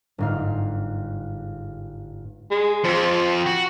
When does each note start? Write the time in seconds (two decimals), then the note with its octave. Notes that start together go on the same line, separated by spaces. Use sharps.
0.18 G1 G#2 F5
2.50 G#3
2.84 F2 F3
3.46 F#4